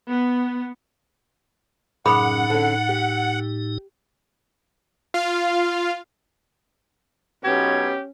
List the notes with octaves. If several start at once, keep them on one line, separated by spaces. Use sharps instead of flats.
B3
F#2 A2 C#3 D#4 G#4 F#5 B5 D#6
D3 C#4
G4
F4 F5
B1 B2 C#4 G4 G#6